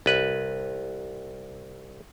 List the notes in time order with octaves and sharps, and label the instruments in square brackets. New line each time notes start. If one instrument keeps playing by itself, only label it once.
[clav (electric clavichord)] C2 B4